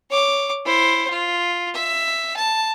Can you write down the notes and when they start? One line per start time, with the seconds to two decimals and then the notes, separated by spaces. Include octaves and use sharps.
0.10 C#5 D6
0.65 E4 C5
1.10 F4
1.74 E5
2.36 A5